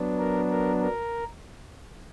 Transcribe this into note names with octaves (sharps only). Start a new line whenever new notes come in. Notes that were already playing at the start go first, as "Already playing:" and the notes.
Already playing: F#3 B3 D4
A#4
A#4
A#4